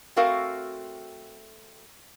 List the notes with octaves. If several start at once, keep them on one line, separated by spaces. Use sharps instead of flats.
A3 C4 F#4 A#4 F5